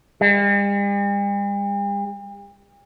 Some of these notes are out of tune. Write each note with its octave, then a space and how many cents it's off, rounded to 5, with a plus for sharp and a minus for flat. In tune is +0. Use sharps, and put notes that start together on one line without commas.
G3 +45